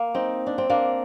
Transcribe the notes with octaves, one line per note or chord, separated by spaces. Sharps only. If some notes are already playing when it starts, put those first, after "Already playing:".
Already playing: A#3
C4 D#4
D4
C4
A#3 D4